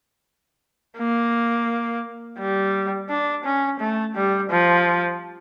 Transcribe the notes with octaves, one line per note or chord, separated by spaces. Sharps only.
A#3
G3
D4
C#4
A3
G3
F3